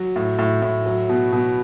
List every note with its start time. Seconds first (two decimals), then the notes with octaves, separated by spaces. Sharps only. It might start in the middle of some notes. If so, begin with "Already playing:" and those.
Already playing: F#3
0.16 A2
0.39 A2
0.62 A2
0.86 F#3
1.09 B2
1.33 B2